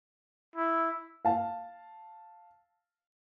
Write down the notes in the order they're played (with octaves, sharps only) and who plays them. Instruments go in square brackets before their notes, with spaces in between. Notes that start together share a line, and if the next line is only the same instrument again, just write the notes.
[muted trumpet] E4
[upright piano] F5 A5